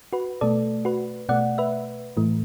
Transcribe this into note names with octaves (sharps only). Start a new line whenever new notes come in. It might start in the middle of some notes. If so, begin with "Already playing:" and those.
F#4 B4
B2 A3 A4 D5
F#4 B4
B2 A3 D5 F#5
B4 E5
A2 E3 A3